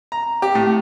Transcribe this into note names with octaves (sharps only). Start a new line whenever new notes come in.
A#5
G4
A2